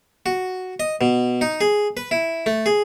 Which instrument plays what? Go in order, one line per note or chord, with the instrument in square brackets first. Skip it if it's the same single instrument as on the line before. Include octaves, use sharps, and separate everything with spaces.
[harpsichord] F#4
D#5
B2
D#4
G#4
B4
E4
A3
G#4